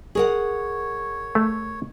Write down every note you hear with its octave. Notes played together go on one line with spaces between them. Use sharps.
G#4 A#4 C#5 F#5
A3